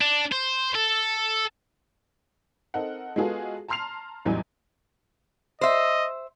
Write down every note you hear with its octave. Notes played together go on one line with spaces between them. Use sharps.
D4
C5
A4
C4 D#4 A4 A#4 F#5
G#3 B3 F4 F#4 G#4 A4
A5 A#5 C6 F6 C7 F7
A1 E2 F#3 G3 D#4 G#5
C5 D#5 E5